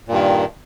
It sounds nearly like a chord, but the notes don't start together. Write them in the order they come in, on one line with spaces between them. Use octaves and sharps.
A#2 G2 D#3